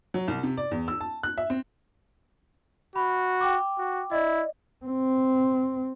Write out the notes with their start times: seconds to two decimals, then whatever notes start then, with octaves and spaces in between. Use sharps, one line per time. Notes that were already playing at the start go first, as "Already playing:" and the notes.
0.14 F#3
0.28 C2
0.43 C3
0.57 D5
0.71 E2
0.88 E6
1.01 A5
1.23 F#6
1.38 E5
1.50 C4
2.96 F#4 B5
3.41 G5 D6
3.78 F#4
4.12 E4 D5 D#5
4.85 C4